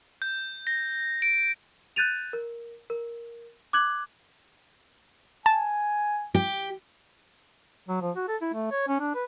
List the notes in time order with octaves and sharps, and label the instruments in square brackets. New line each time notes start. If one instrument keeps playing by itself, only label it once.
[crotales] G6
A#6
D7
[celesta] F#6 G6 A6 D#7 F7
A#4
A#4
D6 F#6 G#6 F#7
[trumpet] G#5 [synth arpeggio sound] A5
[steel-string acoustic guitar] G4
[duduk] F#3
F3
F#4
A4
E4
A3
C#5
C#4
D4
B4